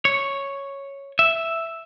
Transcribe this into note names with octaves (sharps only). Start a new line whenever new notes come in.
C#5
E5